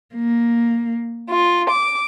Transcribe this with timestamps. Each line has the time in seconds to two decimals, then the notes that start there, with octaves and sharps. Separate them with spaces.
0.16 A#3
1.29 F4
1.70 D6